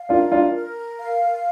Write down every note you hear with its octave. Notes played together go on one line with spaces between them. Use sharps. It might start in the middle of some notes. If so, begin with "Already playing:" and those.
Already playing: F5
D4 F4 A#4
D4 F4
A#4
F5